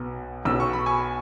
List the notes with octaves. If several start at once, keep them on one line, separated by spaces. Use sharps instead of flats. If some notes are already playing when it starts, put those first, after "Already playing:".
Already playing: B1 B2 B3
B1 B2 B3 E6
C#6
B5
G#5 C#6